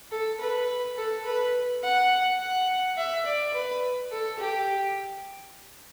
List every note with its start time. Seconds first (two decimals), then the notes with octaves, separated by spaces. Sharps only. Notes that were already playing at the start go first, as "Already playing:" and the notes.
0.11 A4
0.40 B4
0.97 A4
1.26 B4
1.83 F#5
2.39 F#5
2.97 E5
3.25 D5
3.53 B4
4.11 A4
4.39 G4